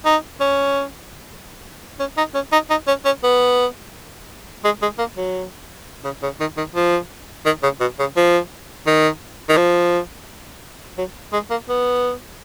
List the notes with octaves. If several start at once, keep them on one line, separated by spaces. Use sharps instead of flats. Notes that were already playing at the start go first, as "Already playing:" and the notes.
D#4
C#4
C#4
D#4
C#4
D#4
D#4
C#4
C#4
B3
G#3
G#3
A#3
F#3
C#3
C#3
D#3
D#3
F3
D#3
C#3
B2
C#3
F3
D#3
D#3
F3
F#3
G#3
A#3
B3